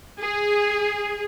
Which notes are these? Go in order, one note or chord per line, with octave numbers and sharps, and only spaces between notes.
G#4